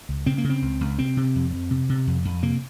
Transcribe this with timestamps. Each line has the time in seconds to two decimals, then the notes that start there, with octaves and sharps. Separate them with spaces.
0.09 C#2
0.26 C#3 C4
0.38 A#3
0.44 C#3
0.50 C4
0.62 C#2
0.81 C#2
0.99 C3 C4
1.17 C3
1.35 F2
1.53 F2
1.71 C3
1.89 C3
2.07 F2
2.25 F2
2.42 C3 A#3